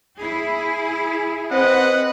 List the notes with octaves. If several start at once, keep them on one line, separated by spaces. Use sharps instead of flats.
E4 G#4
C4 B4 D#5 F#5